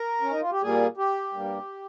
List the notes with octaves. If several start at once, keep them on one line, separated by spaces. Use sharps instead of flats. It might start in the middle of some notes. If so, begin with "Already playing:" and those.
Already playing: A#4
C#4
D#4
F4
G4
A#2 G3 A#3 G#4
G4
G2 G3 A#3